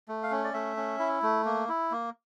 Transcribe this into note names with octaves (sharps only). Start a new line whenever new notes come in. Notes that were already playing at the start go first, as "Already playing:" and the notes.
A3
F5
C#4
D5
A3 E5
C#4
E4
A3
A#3
E4
A#3